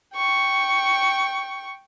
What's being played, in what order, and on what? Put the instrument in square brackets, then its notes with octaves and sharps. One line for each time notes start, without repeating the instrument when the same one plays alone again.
[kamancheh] G5 C#6